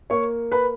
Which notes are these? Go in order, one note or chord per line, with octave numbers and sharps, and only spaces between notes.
A#3 C#5 C#6
B4 B5